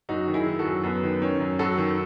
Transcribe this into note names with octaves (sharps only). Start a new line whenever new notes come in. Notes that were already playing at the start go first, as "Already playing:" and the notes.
F#2 D#4 F#4
D#3
E4 G#4
D#3
F#4 A4
F#2
F#2 B3
D#3
D#3 C#4
F#2
F#2 F#4 A4
D#3